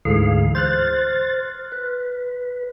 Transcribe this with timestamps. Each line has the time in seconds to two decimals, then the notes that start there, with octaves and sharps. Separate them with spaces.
0.05 D2 G#2 D3 E3 G#4 F5
0.55 C5 C6 F6 F#6 A6
1.72 B4